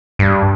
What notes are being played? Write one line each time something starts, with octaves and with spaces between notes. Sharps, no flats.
G2